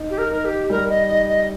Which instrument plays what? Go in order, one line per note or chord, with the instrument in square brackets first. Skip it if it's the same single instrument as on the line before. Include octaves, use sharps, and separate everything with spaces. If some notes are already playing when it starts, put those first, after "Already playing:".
Already playing: [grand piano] D#4
[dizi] G4
A#4
[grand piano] D#4 [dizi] A#4
[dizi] G4
[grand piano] G3 [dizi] A#4
[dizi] D#5
[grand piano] D#4 [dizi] D#5
[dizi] D#5